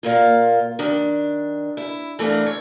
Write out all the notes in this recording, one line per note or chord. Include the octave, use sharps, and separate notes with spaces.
A#2 A#3 F4
D#3 D4
E4
E3 A3 A#3 D4
C#5